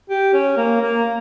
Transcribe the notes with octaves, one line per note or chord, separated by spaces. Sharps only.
G4
C#4
A#3
A#3